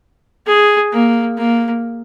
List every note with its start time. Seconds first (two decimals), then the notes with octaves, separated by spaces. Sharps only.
0.47 G#4
0.93 A#3
1.38 A#3